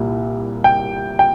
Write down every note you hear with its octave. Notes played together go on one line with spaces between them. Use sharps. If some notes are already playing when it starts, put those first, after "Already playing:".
Already playing: C2 A#2 G3 E4
G5
G5